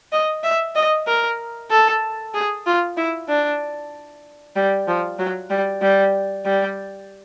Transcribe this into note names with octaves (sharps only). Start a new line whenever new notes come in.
D#5
E5
D#5
A#4
A4
G#4
F4
E4
D4
G3
F3
F#3
G3
G3
G3